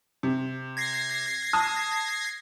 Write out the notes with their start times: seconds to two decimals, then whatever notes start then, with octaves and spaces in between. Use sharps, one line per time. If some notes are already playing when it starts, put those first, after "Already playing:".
0.23 C3
0.77 G#6 A#6 C7
1.53 A5 D#6